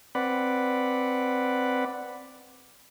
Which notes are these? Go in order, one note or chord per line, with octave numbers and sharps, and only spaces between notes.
C4 B4 D5 F#5 B5